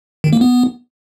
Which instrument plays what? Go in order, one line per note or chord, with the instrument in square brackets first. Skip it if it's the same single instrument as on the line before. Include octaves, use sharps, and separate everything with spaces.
[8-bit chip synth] D#3
A#3
B3